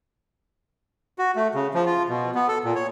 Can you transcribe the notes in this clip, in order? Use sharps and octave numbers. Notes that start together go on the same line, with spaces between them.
F#4
A3
C#3
F3
F4
B2
B3
A4
A#2
C#5